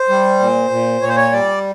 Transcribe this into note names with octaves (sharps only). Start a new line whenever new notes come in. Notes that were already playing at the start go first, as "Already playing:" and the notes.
Already playing: C5
G3
A#2
A#2
A#2 C#5
C5
C#5
G3 D5